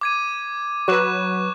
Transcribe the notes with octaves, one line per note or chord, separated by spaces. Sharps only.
D6 G#6 D#7
F#3 B4 C#6 F#6 E7